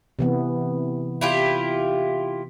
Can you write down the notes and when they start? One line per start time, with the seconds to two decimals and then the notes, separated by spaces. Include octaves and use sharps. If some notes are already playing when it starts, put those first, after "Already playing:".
0.19 C3 E3 B3
1.21 E4 F4 G4